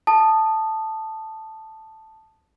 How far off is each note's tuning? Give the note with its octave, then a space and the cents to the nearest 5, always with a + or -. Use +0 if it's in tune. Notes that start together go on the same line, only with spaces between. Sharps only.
A5 +0 D#6 -15